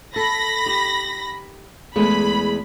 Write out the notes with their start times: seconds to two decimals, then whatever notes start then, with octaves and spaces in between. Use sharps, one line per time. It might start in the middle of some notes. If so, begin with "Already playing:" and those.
0.16 A4 B5 A#6
0.66 D#4 G4
1.96 E2 G#3 A3 B5